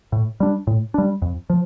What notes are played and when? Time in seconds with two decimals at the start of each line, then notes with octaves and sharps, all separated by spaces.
0.12 A2
0.40 G3 D4
0.67 A2
0.94 G3 D4
1.22 F2
1.50 F3